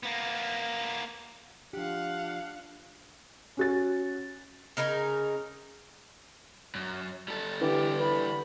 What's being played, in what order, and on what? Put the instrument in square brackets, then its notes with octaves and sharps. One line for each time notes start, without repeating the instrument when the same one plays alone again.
[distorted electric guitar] A#3 B3
[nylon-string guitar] F3 G4 [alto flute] D4 [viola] F5 F#5
[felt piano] C#4 F#4 A6
[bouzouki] C#3 D#4 A#4 G#5
[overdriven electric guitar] F#2
G3 A4
[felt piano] D3 [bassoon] E3 [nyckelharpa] G4
[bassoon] E3 [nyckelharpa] B5